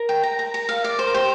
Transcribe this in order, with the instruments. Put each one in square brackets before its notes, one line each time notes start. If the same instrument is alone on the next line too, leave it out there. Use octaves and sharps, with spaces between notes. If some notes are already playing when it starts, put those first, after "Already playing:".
Already playing: [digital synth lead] A#4
[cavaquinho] G5
A#5
A#5
A#5
F5
D5
C5
[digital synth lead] A#4
[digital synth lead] G4 [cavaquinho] C5